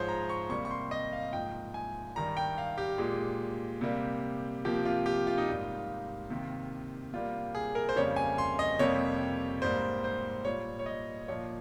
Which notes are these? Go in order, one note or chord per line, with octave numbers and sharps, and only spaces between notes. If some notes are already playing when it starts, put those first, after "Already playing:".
Already playing: G#2 F3 G#3 C5 C#5
A#5
C#6
C3 G3 A#3 C#6
C#6
C6
D#5
F5
G#2 F3 A#3 G5
G#5
G2 D#3 G3 A#5
G5
F5
G4
A#2 G#3
C3 G3 A#3
C3 F3 A#3 G4
F4
G4
F4
D#4
G#2 G3 A#3 F4
C3 D#3 A#3
C3 G3 A#3 F4
G#4
A#4
C5
F2 C#3 G3 A#3 C#5
G#5
C6
D#5
F2 C3 G3 A#3 C#5
G#2 G3 A#3 C5
C5
A#2 G3 A#3 C#5
C#5
D#5
A#2 F3 A#3 C#5